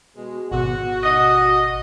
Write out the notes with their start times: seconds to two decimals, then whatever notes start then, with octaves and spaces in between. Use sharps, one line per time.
0.17 B2 G#3
0.52 G#1 B2 F#4
1.03 D#5